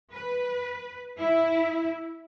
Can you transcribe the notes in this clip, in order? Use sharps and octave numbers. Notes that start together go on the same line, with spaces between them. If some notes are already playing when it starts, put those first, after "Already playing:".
B4
E4